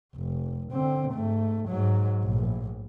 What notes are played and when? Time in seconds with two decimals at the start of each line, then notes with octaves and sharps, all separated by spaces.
0.16 F1
0.73 D3 C4
1.12 G#2 A3
1.68 G#2 F#3
2.23 A#1 A2